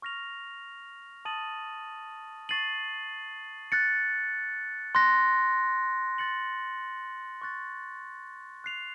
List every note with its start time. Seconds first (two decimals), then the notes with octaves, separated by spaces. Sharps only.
0.02 C#6 F6 A#6 F7
1.25 A5 D#6 A6 D#7 F#7
2.49 C#6 A6 C7 D#7 F#7
3.72 F#6 A6 C#7
4.95 C6 F#6 A#6
6.18 F#6 A6 C#7 F#7
7.42 C#6 F#6 A6
8.64 F#6 C7 F7